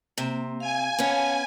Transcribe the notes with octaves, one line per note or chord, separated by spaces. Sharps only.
C3 A#3 C4
F5 G#5
B3 C#4 C#5 F5 A5